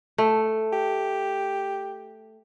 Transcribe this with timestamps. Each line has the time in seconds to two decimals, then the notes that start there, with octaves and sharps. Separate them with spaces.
0.18 A3
0.73 G4